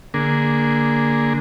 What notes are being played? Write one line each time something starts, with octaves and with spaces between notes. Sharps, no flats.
D3 A#3 G#4